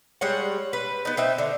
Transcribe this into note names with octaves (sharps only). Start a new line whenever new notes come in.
G3 G#3 C#5 F#5
B4
B3 D#4
C4 D#4 E5
D3